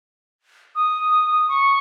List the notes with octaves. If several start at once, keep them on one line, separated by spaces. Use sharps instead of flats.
D#6
C#6